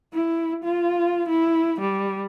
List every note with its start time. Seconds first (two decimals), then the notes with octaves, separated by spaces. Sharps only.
0.13 E4
0.64 F4
1.29 E4
1.81 G3